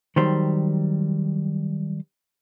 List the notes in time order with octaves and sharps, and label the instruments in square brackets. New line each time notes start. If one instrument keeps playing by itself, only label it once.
[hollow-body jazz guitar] D#3 F#3 G3 C5